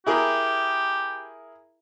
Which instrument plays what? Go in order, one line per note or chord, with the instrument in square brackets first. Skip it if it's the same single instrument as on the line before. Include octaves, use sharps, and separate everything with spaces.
[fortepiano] E4 G#4 A#4 [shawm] G4